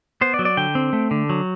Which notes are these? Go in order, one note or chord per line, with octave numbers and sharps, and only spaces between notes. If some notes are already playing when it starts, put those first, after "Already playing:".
B3 C5
D5
F#3
D5
D3 G5
C4
A3
D3
F#3